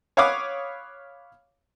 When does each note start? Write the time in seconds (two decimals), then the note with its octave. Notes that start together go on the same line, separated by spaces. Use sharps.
0.17 C#5 F5 F#5 B5 D6 D#6